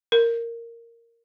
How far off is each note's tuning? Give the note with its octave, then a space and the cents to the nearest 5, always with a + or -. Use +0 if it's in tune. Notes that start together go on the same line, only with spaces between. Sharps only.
A#4 -10